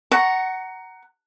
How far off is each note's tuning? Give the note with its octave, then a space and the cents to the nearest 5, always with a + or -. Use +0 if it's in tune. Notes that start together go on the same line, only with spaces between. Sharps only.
F#5 +20 A#5 +0 C#6 +0